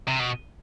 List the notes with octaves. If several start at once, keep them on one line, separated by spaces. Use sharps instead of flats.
C3
B2